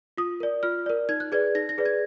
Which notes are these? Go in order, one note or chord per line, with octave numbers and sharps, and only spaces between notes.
F4 D#6
A#4 D5
F4 F6
A#4 D5
D#4 G#6
F#6
G#4 B4 D5 G#6
D#4 A#6
A#6
G#4 B4 D5
G#6